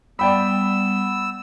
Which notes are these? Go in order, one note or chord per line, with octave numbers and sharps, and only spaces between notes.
G3 B3 D5 G5 B5 E6